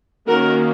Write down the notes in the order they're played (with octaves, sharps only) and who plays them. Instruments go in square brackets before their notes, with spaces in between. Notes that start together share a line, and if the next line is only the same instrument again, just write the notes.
[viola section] D#3 A#3 C#4 F#4 A#4